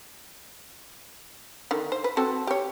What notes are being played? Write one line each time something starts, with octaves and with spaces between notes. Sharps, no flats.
D3 D#3
C5
B4
C4 F#4 A4
G4 C#5